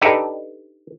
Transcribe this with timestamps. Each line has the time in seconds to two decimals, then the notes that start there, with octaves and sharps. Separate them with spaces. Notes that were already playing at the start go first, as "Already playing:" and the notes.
0.01 D4 D#4 G4 A4 B4